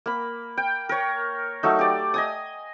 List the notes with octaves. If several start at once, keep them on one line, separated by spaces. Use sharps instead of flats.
A#3 B5
G5
A#4 C#5
F#3 A3 D#4
G4 D5
D#5 G#5 D#6